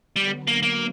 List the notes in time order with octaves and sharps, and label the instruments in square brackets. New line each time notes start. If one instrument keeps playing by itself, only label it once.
[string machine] D3 F#3 B3 [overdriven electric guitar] G3
[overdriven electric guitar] A#3
A#3